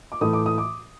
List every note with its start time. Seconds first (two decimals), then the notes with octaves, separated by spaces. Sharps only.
0.12 D6
0.21 A2 E3 A3 D#6
0.33 D6
0.46 D#6
0.58 D6